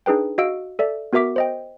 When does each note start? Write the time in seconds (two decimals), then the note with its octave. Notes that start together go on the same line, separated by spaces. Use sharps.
0.06 D4 D#4 G#4 B4 G5
0.38 F#4 D#5 F5 E6 D7
0.79 A4 D5 E5
1.13 B3 F#4 A#4 E5 D6 B6
1.36 C5 D#5 G5